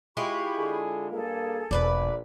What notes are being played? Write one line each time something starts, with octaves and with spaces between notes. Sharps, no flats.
G#3 E4 F4 G4 B5 C#6
D3 G#4 A4
G2 A#3 G#4 A4
E1 A#1 B4 C5 D5